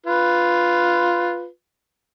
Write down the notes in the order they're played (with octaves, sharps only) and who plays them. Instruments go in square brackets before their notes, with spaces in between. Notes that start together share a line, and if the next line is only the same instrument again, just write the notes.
[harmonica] F4 B4